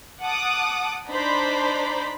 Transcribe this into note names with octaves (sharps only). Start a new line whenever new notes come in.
F#5 A5 D6 D#6
D4 D#4 C5 D5 A#5 B5